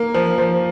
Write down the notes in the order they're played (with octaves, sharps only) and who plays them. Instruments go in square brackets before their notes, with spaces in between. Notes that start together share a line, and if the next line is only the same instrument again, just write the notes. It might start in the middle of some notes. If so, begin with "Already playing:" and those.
Already playing: [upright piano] A#3
F3
F3